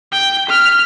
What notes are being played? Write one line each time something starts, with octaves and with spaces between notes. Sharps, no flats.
G5
F6 B6